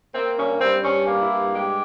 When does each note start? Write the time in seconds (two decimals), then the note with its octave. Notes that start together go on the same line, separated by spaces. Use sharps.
0.15 A#3 C4
0.38 G2 C#4
0.61 G3 C4
0.84 G2 C#4
1.07 A#3
1.19 E4
1.30 G2
1.54 G#3 G4